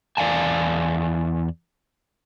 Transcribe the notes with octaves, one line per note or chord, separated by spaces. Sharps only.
E2 D5 F5 G#5 A5